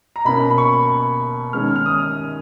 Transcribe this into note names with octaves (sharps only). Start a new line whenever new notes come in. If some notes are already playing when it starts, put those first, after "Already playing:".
A#5
B2 A#3 C#4 B5
B5
C#6
D#3 G#3 C#4 F6
F6
D#6